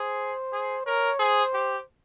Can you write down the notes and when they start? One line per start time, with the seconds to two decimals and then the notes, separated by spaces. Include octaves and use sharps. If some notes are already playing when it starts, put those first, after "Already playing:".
Already playing: G#4 C5
0.53 G#4
0.85 A#4 C#5
1.19 G#4 C5
1.54 G4